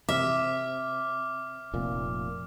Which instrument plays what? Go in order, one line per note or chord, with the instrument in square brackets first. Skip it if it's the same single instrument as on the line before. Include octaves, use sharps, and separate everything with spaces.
[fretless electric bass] C3 [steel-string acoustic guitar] E5 [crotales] D6 F6
[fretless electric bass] F1 A#2